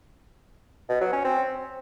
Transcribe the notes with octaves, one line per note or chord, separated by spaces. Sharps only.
B2
F#3
C#4
C4